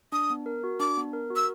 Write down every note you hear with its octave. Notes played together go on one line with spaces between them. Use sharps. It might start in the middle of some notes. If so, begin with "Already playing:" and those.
D4 D#6
B3
A#4
F#4
D4 D6
B3
A#4
F#4
E6